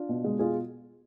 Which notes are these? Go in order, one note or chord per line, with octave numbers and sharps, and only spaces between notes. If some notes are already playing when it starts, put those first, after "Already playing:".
Already playing: D4 F4
B2
G#3
B2 F4 G#4